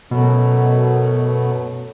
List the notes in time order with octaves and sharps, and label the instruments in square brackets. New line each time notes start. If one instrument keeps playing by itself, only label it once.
[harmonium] F#2 F#3 A3 [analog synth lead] B2